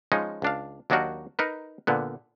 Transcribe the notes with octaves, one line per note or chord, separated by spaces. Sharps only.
F3 G#3 C#4 D#4
C#2 D4 F5
D#2 F#3 D4 D#4 F#4 A#4
D#4 A#4 B4
A#2 D3 B3